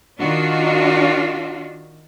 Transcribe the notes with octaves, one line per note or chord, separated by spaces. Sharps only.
D#3 D4 F4 F#4